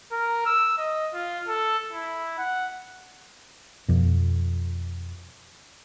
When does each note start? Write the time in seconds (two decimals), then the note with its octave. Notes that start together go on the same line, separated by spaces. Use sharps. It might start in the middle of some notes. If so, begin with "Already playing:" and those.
0.12 A#4
0.46 E6
0.78 D#5
1.14 F4
1.48 A4
1.92 E4
2.38 F#5
3.88 F2 B2